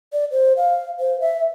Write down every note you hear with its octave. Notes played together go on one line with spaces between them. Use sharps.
D5
C5
F5
C5
E5